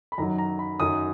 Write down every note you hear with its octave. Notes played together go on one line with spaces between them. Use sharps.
B5
F#2 D#3 F#3 A#5
A#5
B5
F#2 D#3 F#3 D#6